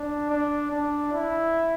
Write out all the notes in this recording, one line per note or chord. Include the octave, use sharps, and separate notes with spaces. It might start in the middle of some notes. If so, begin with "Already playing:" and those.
Already playing: D4
D4
D4
E4